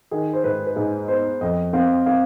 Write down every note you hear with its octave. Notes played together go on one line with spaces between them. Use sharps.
D#3 G#4
C5
G#2 B4
B4
G#2 G#4
B3 C5
F2 D#5
C4 F5
C4 F5